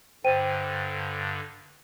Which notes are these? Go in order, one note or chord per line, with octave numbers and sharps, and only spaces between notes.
G2 D3 C5 G5 D#7